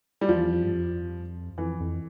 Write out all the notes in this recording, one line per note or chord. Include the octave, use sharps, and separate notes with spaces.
G3
E2 F3
F2
G2
F2
F2 E3
F2